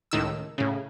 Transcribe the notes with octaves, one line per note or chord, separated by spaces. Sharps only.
C#2 A2 D#3 E6
A2 C#3